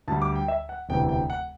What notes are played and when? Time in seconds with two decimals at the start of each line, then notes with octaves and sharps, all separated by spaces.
0.08 D2 D3 G3 A5
0.22 D6
0.35 G5
0.48 E5
0.69 F#5
0.89 E1 D2 C3 E3 G5
1.09 G5
1.30 F#5